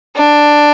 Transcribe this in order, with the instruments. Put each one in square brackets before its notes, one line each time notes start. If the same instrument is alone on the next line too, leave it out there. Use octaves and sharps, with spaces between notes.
[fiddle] D4